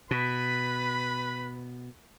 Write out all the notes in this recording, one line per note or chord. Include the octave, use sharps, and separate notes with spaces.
B2 B4 B5